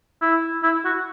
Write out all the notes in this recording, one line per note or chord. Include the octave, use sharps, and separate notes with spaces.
E4
E4
F#4